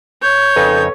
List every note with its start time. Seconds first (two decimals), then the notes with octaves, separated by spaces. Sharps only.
0.22 C#5 G6
0.56 F2 C#3 D#4 A4 B4